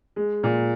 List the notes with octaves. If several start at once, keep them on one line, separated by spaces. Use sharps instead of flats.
G#3
A#2